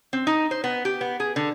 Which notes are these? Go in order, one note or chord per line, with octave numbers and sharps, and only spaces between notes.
C4
D#4
C5
B3
G4
B3
G#4
D3